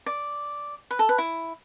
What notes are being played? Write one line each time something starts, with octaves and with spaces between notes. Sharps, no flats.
D5
B4
A4
B4
E4